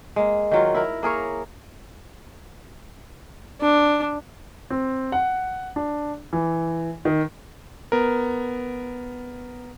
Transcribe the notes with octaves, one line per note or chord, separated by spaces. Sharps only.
G#3 A#3
D#3 F#3 F4
E4 A#4
A#3 G#4 A#4 C#5
D4
C4
F#5
D4
E3
D#3
B3 A#4